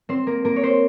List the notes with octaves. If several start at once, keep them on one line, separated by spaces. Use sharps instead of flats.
C4 C5
A#3 A#4
A#3 A#4
C#5
C4 C5